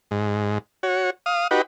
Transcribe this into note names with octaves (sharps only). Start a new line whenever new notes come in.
G#2
F#4 C#5
F5 D#6
D#4 F#4 G4 B4